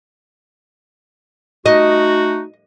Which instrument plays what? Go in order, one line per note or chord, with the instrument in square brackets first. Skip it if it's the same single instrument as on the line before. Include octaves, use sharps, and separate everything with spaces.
[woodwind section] A3 D#4 F#4 [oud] D#5